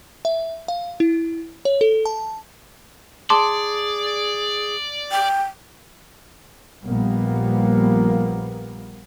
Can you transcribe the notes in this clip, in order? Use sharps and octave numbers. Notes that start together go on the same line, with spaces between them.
E5
F5
E4
C#5
A4
A5
G#4 D5 A5 C6 D6
G5
A#1 A#2 G3 A#3 B3